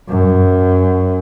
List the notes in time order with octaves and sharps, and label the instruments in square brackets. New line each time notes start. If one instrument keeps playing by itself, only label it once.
[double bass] F#2